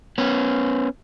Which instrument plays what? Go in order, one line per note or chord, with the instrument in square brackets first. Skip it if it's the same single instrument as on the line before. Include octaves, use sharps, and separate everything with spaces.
[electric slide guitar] B3 C#4